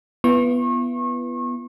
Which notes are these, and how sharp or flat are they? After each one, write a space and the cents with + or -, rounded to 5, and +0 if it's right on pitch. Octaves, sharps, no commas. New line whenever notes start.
B3 -5 E4 +45 C#6 -35